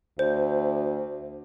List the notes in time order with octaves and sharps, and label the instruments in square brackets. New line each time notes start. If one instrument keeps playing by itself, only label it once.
[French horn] D2 [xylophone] C5